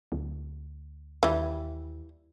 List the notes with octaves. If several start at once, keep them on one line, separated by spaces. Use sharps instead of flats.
D2
D#2 E3 G3